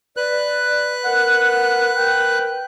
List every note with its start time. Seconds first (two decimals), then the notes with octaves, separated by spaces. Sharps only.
0.17 B4 D5 F#6
1.05 A#4 F#5
1.97 G5